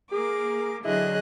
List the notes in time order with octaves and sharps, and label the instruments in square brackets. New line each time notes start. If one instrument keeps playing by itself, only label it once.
[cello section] A#3 A#4 [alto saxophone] G#4 [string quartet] D6
[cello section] D3 F#3 [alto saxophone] E4 [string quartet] G#4 D#5 F#6